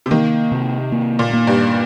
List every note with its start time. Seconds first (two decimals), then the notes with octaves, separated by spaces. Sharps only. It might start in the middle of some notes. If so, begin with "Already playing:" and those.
0.06 C3
0.11 D#3 A#3
0.52 C3
0.92 A#3
1.19 A#2
1.33 A#3
1.47 G2